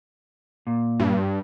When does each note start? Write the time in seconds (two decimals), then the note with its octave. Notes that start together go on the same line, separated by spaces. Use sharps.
0.67 A#2
1.00 G2